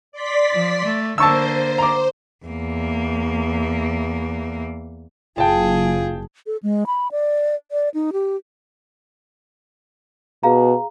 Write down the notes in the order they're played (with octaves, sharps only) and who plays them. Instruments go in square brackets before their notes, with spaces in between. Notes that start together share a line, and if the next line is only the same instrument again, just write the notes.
[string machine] D5 C6 B6
[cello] F3
A3
[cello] D3 A#3 [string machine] C5 [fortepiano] A5 C#6 E6
[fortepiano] A#5 D6
[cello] E2 A#3
[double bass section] F#1 [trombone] F4 [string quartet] G#4 [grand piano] G5 A5
[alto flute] A4
G#3
B5
D5
D5
D#4
G4
[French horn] B2 [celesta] G#4 F5 A#5